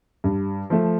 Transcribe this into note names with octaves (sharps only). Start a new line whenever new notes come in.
G2
F3 A3